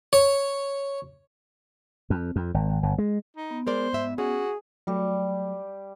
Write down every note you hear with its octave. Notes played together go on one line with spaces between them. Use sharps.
C#5
F2
F2
G#1
G1
G#3
D#4
B3
G#3 A#4 C5 D5
G#2 E5
C#4 F#4 G#4
F#3 G3 A3 G4